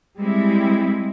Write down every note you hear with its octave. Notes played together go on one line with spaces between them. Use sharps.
G3 G#3 C4 E4